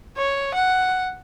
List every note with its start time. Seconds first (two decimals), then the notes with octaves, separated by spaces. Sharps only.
0.17 C#5
0.54 F#5